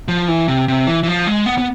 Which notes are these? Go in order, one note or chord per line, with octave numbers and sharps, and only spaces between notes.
F3
E3
C3
C3
E3
E3
F3
G#3
B3
B3